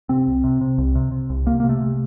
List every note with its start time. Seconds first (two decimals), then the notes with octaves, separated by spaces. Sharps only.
0.09 C3 C4
0.28 C2
0.44 C3
0.61 C3
0.78 C2
0.95 C3
1.12 C3
1.30 C2
1.46 C3 A#3
1.60 C3 A#3
1.69 A3
1.81 C3